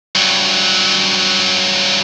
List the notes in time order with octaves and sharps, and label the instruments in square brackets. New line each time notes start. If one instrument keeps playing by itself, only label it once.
[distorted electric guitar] G2 F#3